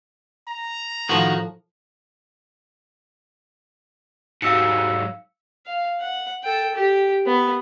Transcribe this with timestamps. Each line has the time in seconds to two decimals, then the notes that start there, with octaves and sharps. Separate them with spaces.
0.48 A#5
1.09 A2 D#3 F3 F#4
4.42 G#2 F#3 F5 E6 C#7
5.66 F5
6.00 F#5
6.43 A4 G5
6.75 G4
7.26 B3